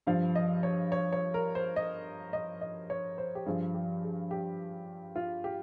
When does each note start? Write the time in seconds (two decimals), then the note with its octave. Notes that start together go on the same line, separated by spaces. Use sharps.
0.07 G2 F3 F5
0.35 D#5
0.63 C#5
0.92 C#5
1.13 C#5
1.34 A#4
1.55 C5
1.76 D#5
2.33 D#5
2.61 D#5
2.90 C#5
3.18 C5
3.35 G4
3.46 G2 F3 G#4
3.74 G4
4.03 G#4
4.31 G4
5.16 F4
5.44 G4